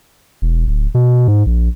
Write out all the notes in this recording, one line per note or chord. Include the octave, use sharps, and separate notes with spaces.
E1
D1
B2
G#2
A#1